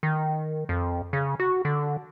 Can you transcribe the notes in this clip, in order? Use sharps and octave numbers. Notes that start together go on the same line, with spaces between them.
D#3
F2
C#3
F#4
D3